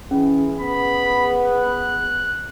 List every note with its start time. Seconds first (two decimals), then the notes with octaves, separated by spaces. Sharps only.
0.11 E3 C#4 G#4
0.61 B3 B5
1.46 F#6